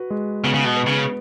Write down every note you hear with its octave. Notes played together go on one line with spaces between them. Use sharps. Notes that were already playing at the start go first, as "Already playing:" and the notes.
Already playing: F#4 B4
G#3
C#3 B3
C#3
B2
B4
C#3